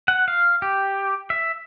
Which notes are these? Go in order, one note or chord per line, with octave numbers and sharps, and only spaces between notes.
F#5
F5
G4
E5